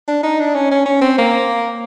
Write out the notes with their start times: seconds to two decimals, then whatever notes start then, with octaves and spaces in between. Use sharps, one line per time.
0.08 D4
0.23 D#4
0.40 D4
0.55 C#4
0.71 C#4
0.85 C#4
1.01 C4
1.18 A#3